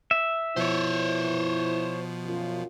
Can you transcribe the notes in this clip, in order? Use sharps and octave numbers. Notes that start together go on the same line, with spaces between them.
E5
B2 F3 E4 C5 C#5
F#2 F4